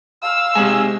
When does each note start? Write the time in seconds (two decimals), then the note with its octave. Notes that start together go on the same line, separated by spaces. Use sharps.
0.22 F5 E6
0.55 C3 G#3 C4 C5 G#5